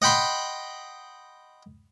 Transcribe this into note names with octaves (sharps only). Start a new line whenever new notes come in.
D#5 F#5 G5 B5 C6